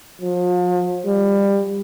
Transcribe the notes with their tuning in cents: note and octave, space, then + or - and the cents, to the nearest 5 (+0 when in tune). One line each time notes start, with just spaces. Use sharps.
F3 +40
G3 +25